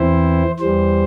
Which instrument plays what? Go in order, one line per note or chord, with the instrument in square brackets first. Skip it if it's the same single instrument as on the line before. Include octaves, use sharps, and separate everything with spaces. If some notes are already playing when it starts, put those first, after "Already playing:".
Already playing: [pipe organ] E2 E3 C4 E4 C5
E2 E3 G3 C5